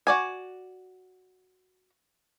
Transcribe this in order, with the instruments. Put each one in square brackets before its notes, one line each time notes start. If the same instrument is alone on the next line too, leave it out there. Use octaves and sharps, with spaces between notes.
[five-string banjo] F#4 D5 G#5